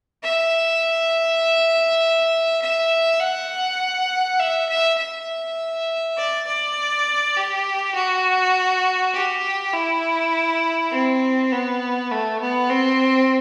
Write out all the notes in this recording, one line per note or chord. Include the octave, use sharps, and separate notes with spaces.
E5
E5
F#5
E5
E5
E5
D5
D5
G4
F#4
G4
E4
C4
B3
A3
B3
C4